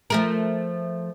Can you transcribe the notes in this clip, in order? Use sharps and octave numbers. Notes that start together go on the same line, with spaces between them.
F3 A3 A#4